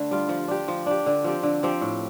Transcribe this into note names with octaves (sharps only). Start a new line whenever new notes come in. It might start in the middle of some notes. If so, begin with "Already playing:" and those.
Already playing: D3 A3
G3 F4
F3
D4 G4
F3
D4 G4
D3
F3 C4 G4
D3
F3 C4 G4
A2